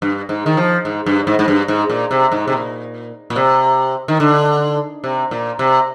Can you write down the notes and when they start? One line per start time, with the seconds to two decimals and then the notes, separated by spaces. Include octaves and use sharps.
0.02 G2
0.29 G#2
0.46 D#3
0.57 F3
0.85 G#2
1.06 G2
1.27 G#2
1.39 G#2
1.48 G2
1.68 G#2
1.90 A#2
2.11 C3
2.32 G#2
2.48 C3
2.52 A#2
3.30 A#2
3.36 C3
4.08 D#3
4.20 D3
5.04 C3
5.31 A#2
5.59 C3